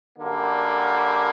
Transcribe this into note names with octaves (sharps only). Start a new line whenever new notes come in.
F#2 D3 G3 A#3